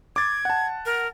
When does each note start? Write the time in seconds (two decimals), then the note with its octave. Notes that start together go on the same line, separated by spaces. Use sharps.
0.16 D6 G#6 A6
0.45 F#5 A5
0.86 A#4